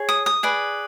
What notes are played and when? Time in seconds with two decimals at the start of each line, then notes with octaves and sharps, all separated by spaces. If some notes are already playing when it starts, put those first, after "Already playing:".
Already playing: G#4 C#5
0.09 D#6
0.26 D#6
0.43 G#4 B4 D5